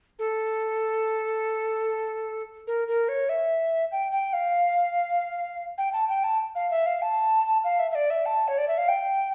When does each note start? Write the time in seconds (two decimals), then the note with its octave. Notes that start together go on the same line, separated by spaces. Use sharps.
0.19 A4
2.67 A#4
2.88 A#4
3.09 C#5
3.29 E5
3.92 G5
4.12 G5
4.33 F5
5.78 G5
5.93 A5
6.09 G5
6.24 A5
6.55 F5
6.71 E5
6.86 F5
7.02 A5
7.64 F5
7.79 E5
7.91 E5
7.95 D5
8.10 E5
8.26 A5
8.48 C#5
8.58 D5
8.68 E5
8.78 F5
8.88 G5